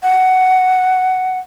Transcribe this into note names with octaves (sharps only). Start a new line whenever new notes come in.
F#5